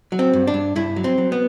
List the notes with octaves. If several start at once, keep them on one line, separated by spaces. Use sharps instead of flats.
F#3
C4
G2
D4
G2
G2 E4
F#3
C4
F#3
B3